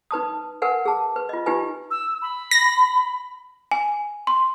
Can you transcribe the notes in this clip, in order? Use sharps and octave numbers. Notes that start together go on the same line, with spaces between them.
D#4 B4 A5 D#6
A#4 B4 F#5 G#5
G#4 A5
B4
F4 D#5
D#4 F4 G4 B4 G#5
E6
B5
A#6
G#5
C6